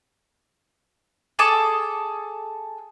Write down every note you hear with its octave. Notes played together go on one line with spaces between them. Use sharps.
G#4 A4 A5 D6